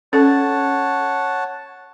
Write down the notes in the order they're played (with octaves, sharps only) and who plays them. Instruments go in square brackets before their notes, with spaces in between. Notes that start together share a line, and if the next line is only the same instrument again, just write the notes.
[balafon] C#4 A4 [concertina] C#5 F#5 A5